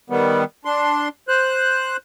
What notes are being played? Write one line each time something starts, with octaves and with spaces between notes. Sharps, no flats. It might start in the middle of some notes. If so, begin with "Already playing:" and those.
D#3 G3 B3
D4 C6
C5 F#6